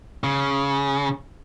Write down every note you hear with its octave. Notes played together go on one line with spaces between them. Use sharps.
C#3